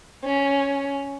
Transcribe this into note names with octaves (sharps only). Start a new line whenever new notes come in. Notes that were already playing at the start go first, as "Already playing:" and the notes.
C#4